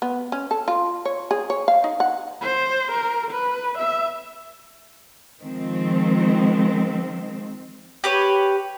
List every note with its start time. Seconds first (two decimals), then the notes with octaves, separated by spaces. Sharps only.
0.02 B3
0.32 C#4
0.51 A4
0.68 F4
1.05 C#5
1.31 G#4
1.50 C#5
1.68 F5
1.84 D#4
2.00 F#5
2.41 C5
2.92 A#4
3.31 B4
3.78 E5
5.41 D#3 F3 G#3 C4
8.04 G4 B4 C#5